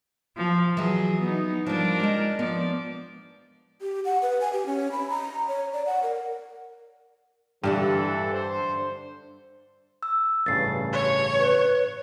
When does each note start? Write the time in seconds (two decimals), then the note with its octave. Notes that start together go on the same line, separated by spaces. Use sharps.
0.37 F3
0.77 E3 F#3 G#4
1.21 B3 D#4
1.66 F3 G3 D4 A#4
2.00 G#3 D#4
2.39 F3 B3 D5
3.82 G4
4.05 F#5
4.22 B4
4.41 G#5
4.53 G4
4.66 C#4
4.92 B5
5.10 A#5
5.48 C#5
5.73 D5
5.86 F#5
6.03 A#4
7.64 G2 D3 E3 D4 G4 A4
8.34 C5
10.03 E6
10.46 A1 G2 C#3 A6 C7
10.92 C#5
11.39 B4